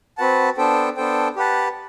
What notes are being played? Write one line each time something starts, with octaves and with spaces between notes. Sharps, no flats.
C4 F#4 B4 F#5 A5
B3 D4 A4 C5 G5
B3 D4 A4 C5 G5
G4 B4 F#5 A5